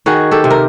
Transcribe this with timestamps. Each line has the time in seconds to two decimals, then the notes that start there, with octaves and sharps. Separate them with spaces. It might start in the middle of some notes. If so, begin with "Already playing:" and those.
0.06 D#3 F#4 G#4
0.31 G4 A4
0.44 C3
0.50 A#4